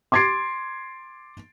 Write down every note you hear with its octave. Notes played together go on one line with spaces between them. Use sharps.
C6 D6 G#6 A6 C7 D7